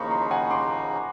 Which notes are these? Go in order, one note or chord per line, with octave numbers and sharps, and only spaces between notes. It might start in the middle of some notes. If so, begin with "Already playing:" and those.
Already playing: D#2 C#3 F3 A#3 D#4 B5 C#6
A#5 C6
F#5 G#5
C6 D6